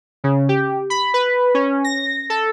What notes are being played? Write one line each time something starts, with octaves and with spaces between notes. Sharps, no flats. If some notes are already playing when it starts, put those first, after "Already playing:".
C#3
G4
B5
B4
C#4
A#6
A4